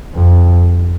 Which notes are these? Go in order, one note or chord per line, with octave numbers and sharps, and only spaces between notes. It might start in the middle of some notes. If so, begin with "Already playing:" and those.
F2